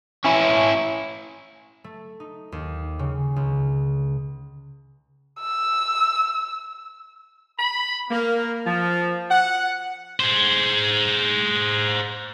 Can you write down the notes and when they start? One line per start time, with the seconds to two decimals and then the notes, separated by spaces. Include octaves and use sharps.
0.25 C#4 E4
1.84 A3
2.20 D#4
2.52 D#2
2.99 C#3
3.36 C#2
5.40 E6
7.59 B5
8.11 A#3
8.67 F3
9.30 F#5
10.20 G#4 C5